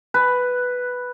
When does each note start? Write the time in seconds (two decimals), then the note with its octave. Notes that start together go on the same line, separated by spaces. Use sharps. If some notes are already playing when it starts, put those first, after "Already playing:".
0.14 B4